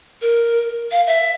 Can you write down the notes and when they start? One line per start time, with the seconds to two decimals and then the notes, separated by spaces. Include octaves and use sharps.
0.22 A#4
0.91 F5
1.07 E5